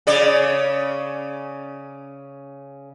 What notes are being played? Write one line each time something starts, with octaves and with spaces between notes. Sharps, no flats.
C#3 C#4 D5